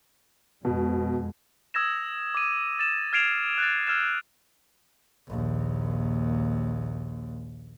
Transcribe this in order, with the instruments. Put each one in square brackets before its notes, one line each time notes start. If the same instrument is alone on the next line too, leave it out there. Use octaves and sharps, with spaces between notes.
[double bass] F2 G#3 [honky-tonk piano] B2
[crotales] D#6 E6 G#6 A#6 E7
D6 D#7
A6 E7
F6 G#6 C7 D7 E7 F7
F#6 A6
E6 F6 G#6 E7
[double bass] A#1 D#2